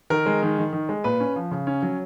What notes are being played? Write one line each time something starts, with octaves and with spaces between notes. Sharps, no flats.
D#3 A#4
G#3
D#3
D#3
D#3
G#3
A#2 B4
C#4
F3
C#3
C#4
F#3